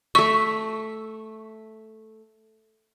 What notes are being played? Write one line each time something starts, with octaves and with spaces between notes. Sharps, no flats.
A3 E5 C#6